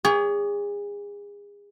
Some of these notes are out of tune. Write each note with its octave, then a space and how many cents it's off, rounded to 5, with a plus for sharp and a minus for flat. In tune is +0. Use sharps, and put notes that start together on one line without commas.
G#4 -30 C#5 +35